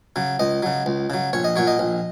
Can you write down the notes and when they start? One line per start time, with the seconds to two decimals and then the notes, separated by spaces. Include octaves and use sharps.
0.16 C#3 F#3
0.39 C#2 D#5
0.63 C#3 F#3
0.86 C#2
1.10 C#3 F#3
1.33 A#1 C#5
1.44 D#5
1.56 A#2 F#3 C#5
1.67 D#5
1.79 A#1